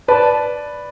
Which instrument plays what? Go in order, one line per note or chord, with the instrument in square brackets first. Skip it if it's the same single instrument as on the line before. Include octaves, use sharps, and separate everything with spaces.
[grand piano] B4 D5 [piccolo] A5